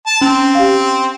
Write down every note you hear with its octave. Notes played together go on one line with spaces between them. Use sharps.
A5
C4 C#4
G4 F5